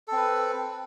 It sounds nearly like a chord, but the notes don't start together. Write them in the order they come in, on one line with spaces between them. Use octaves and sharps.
A4 C4 B4